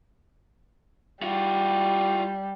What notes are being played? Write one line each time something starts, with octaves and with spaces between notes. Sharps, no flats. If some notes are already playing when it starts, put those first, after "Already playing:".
G3 F4 F#4